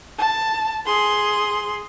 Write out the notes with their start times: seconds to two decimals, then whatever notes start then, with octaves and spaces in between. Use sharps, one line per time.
0.18 A5
0.86 G#4 C6